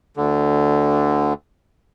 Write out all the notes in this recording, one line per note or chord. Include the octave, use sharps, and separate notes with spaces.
D2 D3